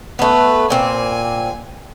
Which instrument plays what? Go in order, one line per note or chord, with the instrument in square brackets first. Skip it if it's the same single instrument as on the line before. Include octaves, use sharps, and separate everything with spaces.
[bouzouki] A3 B3 [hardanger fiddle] B4
[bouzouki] A#2 C4 [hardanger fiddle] G#5